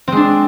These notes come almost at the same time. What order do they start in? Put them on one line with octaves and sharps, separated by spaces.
C4 G#3 D4